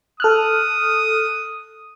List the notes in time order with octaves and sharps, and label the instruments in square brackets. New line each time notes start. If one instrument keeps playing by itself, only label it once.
[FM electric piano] A4 F6 F#6 [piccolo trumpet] D#6